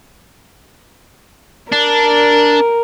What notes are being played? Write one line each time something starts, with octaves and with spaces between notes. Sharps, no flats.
D4 A#4